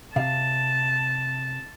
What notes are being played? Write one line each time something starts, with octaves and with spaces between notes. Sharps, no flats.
C3 F5 A5